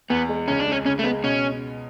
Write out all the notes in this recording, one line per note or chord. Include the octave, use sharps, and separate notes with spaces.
E2 B3
G#3
C#2 C#4
D4
G#3 C#4
C#3 C#4
A3
G#3 B3
B2 C#4